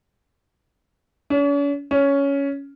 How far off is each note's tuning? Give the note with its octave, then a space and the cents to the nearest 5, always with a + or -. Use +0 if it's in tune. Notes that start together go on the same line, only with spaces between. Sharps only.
C#4 +45
C#4 +10